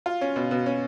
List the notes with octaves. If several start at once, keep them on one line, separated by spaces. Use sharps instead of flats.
F4
C#4
B2
B2
C#4